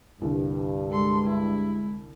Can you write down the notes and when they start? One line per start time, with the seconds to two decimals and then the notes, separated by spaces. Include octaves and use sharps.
0.21 C2 G2 D3
0.91 G#3 A4 C6
1.26 E4